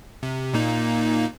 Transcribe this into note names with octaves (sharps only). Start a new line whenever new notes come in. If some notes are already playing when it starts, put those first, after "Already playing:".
C3
A#2 A#3 D#4